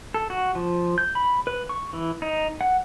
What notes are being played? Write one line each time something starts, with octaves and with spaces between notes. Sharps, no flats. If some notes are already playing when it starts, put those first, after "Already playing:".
A4
F#4
F3
G6
B5
B4
C#6
E3
D#4
F#5